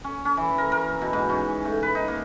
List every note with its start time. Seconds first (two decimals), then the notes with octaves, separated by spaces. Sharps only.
0.04 C#4
0.25 C#4
0.37 E3
0.58 A#4
0.72 A#4
1.02 B2
1.13 G#2
1.29 C#4
1.65 A3
1.83 B4
1.95 D#4
2.08 A#3